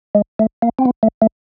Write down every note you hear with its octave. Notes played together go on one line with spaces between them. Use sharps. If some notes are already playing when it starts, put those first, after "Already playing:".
G#3
A3
A#3
C4
B3
A3
A3